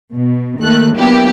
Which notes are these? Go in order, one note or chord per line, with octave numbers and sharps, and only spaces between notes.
B2
D#2 D#3 A3 A4 F#6
F#3 A#3 B3 D4 E4 G4